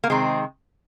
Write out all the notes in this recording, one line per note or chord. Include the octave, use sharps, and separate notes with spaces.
A#3
C3 D#3 G#3 C4